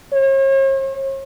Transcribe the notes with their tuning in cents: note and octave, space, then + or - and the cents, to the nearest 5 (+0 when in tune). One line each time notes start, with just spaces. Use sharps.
C#5 -45